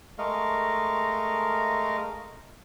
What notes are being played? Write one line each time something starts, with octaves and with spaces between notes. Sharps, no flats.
G#3 A3 A#4 D#5 F5 C#6